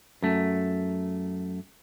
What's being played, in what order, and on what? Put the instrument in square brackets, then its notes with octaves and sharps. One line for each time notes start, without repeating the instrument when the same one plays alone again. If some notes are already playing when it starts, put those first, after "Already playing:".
[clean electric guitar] F#2 A3